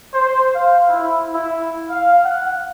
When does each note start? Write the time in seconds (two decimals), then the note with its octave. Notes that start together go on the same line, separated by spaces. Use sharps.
0.13 C5
0.54 F5
0.88 E4
1.33 E4
1.89 F5
2.24 F#5